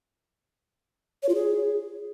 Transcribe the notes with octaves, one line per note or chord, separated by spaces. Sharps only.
C#5
F4
G#4